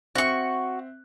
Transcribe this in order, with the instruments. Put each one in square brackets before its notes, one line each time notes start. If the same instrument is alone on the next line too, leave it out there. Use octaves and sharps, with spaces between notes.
[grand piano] C4 E5 F#6 [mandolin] F#4 C#6